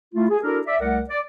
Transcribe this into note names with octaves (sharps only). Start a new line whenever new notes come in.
A3 E4 F4
G#4
D4 E4 F#4 A4 A#4
D5 E5
C2 A3 A#4 D5 F#5
D5